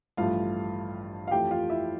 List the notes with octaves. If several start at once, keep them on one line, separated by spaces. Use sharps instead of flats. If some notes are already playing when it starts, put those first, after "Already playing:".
A1 G2 F3 A3 F4 F5
F5
F2 E3 A3 G4 G5
F4 F5
E4 E5